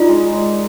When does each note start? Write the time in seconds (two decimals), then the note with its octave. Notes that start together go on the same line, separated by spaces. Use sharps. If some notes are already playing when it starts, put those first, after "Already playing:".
Already playing: D#4 F4 A#4 D5
0.09 G#3
0.33 D5